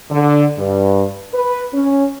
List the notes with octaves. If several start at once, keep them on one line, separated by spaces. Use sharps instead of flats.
D3
G2
B4
C#4